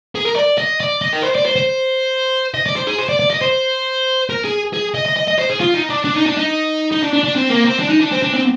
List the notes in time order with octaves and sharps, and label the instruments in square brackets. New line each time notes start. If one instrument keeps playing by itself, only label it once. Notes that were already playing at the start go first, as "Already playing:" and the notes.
[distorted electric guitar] G#4
A#4
D5
D#5
D5
D#5
A#4
C5
D5
C5
C5
D#5
D5
C5
G#4
C5
D5
D5
D#5
C5
A#4
G#4
G#4
D#5
D#5
D#5
D#5
C5
G#4
F4
D#4
D4
D4
D#4
D4
D#4
D#4
D4
D4
D4
C4
A#3
C4
D4
D#4
D4
C4
D4
C4